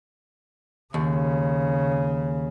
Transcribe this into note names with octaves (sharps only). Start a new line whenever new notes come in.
D#2 C#3